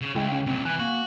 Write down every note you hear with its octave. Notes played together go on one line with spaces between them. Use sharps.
C#3
C#2 G#3 E4 G5
C#4
C2 A#2 C4
E3 G#5 F#6
A#3 F#4